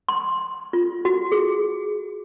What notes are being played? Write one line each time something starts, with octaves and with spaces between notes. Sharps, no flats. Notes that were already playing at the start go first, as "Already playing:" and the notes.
C6
F4
F#4
G#4